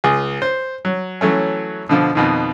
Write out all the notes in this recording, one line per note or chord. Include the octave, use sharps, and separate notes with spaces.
C#2 G#4
C5
F#3
E3 F#3 A3 C#4
B2 D3 F3
F2 B2 D#3